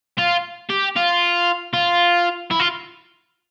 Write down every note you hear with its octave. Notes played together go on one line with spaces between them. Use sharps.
F4
G4
F4
F4
E4
F4